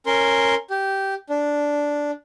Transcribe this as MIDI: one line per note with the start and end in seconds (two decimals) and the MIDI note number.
0.06 0.55 61
0.06 0.55 70
0.06 0.55 84
0.70 1.14 67
1.30 2.11 62